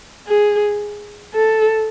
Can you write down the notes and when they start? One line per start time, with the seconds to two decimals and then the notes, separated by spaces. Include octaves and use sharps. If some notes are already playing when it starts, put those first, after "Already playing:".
0.27 G#4
1.34 A4